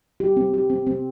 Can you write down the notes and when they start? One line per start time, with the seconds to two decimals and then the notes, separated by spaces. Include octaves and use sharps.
0.20 G4
0.37 C4
0.54 G4
0.70 C4
0.87 C4